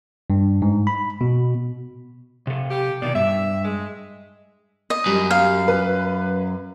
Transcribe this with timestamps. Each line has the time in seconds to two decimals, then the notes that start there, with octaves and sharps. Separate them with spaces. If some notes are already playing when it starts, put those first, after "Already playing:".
0.30 G2
0.62 G#2
0.87 B5
1.21 B2
2.47 C3 A4
2.71 G4
3.02 B2 D#3 D5
3.15 G2 E5
3.65 G#3
4.90 D#5
5.06 F#2 G3
5.31 F5
5.68 B4